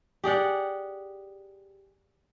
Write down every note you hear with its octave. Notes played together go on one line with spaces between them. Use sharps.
G4 G#4 D5 F#5